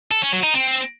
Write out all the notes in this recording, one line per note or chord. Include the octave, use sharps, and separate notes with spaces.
A4
C#4
F#3
D#4
C4